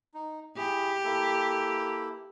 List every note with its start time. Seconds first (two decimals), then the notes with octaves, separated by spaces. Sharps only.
0.14 D#4
0.56 E4 G4 G#4
1.04 A#3 E4 A4